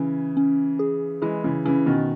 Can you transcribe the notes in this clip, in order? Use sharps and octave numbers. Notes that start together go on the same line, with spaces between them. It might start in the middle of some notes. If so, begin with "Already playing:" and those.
Already playing: C#3 E3 C#4
C#4
G#4
E3 G#3 E4
C#3 E3
C#3 E3 C#4
B2 D#3